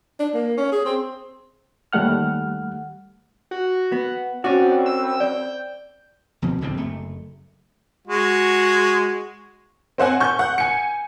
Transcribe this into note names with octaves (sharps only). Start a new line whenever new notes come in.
D4
A#3
C#4
G#4
C4
D#2 G3 A3 F#5 F6
F#4
B3
C4 C#4 F#4 D5
E6
D5 G5
D2 B2 F3 C4
D1 C2 D3 C4
F#1 A3
G#3 F#4
C4 C5 F#5 G#5
C#6 G6
F#5
G#5 C#7